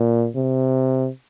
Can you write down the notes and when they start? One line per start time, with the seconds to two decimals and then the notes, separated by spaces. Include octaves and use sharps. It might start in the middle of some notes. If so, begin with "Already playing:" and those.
Already playing: A#2
0.36 C3